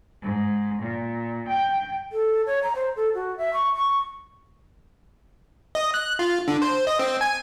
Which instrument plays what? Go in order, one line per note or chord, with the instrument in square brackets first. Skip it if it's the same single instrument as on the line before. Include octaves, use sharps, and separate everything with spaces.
[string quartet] G#2
A#2
G5
[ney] A4
C#5
A#5
C5
A4
F#4
E5
C#6
C#6
[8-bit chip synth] D#5
F#6
F4
D3
C5
D#5
C4
G#5